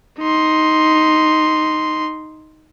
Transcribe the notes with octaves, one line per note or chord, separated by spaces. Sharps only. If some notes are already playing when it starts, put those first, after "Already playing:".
D#4 C6